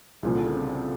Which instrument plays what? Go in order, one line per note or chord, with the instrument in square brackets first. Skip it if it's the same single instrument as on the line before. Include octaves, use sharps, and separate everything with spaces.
[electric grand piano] C2 A#2 F3 [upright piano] C#3
[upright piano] D3
C#3
C3